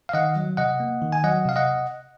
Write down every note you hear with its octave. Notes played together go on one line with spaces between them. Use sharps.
F5
D#3 D#5 F#5
F#3
C3 D#5 F#5
A#3
D#3
G#5
F#3 D#5 F#5
C3 F5
D#5 F#5